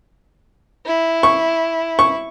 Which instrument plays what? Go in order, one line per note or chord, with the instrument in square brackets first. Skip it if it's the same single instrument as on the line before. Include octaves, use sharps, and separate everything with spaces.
[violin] E4
[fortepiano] C#6
C#6